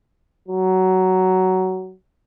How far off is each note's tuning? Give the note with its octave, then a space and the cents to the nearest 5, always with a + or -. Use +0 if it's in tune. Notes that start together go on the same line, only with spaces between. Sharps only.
F#3 +15